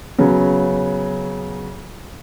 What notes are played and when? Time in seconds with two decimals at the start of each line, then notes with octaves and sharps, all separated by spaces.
0.18 C#3 F#3 B3